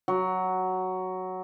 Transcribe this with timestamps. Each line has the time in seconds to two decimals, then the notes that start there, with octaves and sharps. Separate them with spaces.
0.08 F#3